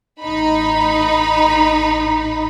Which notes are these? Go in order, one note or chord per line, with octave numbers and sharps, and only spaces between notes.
A1 D#4 B5